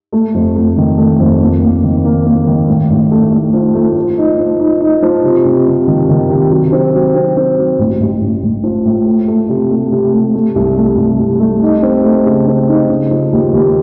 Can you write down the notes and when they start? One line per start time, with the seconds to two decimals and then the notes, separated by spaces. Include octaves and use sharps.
0.12 A3
0.34 F2
0.56 A3
0.77 D#3
0.98 A3
1.19 F2
1.41 A#3
1.62 A#3
1.83 D#3
2.05 A#3
2.25 A#3
2.46 D#3
2.68 A2
2.90 A1
3.11 A3
3.32 A3
3.53 F3
3.74 A3
3.96 F3
4.18 D#4
4.39 F3
4.59 D#4
4.80 D#4
5.02 F3
5.23 C3
5.45 C3
5.66 C3
5.87 D#3
6.09 D#3
6.29 C3
6.51 F#3
6.72 C4
6.94 F#3
7.15 C4
7.37 C4
7.58 F#3
7.79 A1
8.00 A1
8.21 A1
8.43 A1
8.63 F3
8.85 A2
9.06 A3
9.28 A3
9.49 C3
9.70 A3
9.91 C3
10.13 A3
10.34 A3
10.55 C2
10.77 A3
10.97 C2
11.19 C2
11.40 A3
11.62 D#4
11.83 C4
12.04 A3
12.26 C#3
12.47 C4
12.68 D#4
12.89 C#3
13.10 F3
13.32 D#2
13.52 D#2